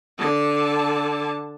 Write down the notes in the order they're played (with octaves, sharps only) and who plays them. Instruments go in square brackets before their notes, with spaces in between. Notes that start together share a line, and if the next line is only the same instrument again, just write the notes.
[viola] D3 A5